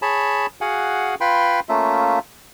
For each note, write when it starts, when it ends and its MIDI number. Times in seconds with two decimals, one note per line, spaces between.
0.02 0.46 68
0.02 0.46 73
0.02 0.46 81
0.02 0.46 83
0.61 1.15 66
0.61 1.15 68
0.61 1.15 77
0.61 1.15 78
0.61 1.15 80
1.21 1.60 65
1.21 1.60 71
1.21 1.60 79
1.21 1.60 83
1.21 1.60 84
1.69 2.19 57
1.69 2.19 58
1.69 2.19 61
1.69 2.19 65
1.69 2.19 76